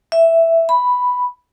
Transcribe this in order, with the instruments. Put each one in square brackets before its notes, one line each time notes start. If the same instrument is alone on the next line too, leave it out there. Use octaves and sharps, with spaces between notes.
[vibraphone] E5
B5